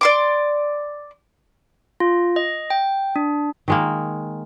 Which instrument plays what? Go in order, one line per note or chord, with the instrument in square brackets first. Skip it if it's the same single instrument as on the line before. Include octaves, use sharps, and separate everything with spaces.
[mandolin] D5 C6 D6
[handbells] F4
D#5
G5
D4
[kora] D#3 G#3 A#3